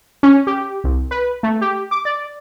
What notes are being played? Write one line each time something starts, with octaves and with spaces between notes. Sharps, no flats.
C#4
G4
C2
B4
A3
G4
D6
D5